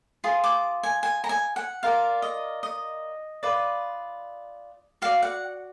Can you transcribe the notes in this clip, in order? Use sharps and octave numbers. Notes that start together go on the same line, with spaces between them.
F4 G#4
D6
G#5
G#5
A#5
G#5
F#5
F4 A#4 D5 F5
D#5
D#5
F4 B4 D5
F#4 D5 F5
F#5